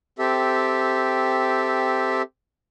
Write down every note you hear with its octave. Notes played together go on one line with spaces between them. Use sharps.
C4 G4 A4 E5